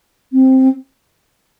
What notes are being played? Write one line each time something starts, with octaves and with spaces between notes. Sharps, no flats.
C4